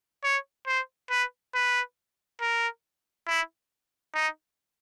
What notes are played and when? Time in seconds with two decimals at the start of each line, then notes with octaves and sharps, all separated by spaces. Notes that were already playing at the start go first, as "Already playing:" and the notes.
0.24 C#5
0.67 C5
1.10 B4
1.54 B4
2.41 A#4
3.27 E4
4.14 D#4